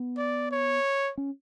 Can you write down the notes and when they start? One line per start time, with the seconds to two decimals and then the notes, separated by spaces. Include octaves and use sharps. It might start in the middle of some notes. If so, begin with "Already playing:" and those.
Already playing: B3
0.18 D5
0.51 C#5
1.18 C#4